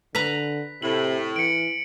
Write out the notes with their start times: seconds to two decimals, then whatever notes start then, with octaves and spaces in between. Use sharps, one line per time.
0.15 D3 B4 A#5 B6
0.82 A2 C3 F#7
1.36 E3 C#7 D7